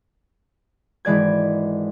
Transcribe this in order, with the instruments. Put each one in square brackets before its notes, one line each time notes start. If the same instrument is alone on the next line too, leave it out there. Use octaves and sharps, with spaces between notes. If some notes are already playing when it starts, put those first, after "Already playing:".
[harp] G#1 E3 G#3 D5 G#6